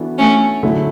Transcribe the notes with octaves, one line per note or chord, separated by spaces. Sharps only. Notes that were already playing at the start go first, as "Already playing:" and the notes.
Already playing: E3 B3 D4 F#4 A4
A3 C#4
D3 F#3 A3 E4